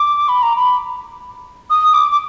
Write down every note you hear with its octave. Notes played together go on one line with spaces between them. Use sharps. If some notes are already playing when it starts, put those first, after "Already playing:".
Already playing: D6
B5
A#5
B5
D#6
D6
D6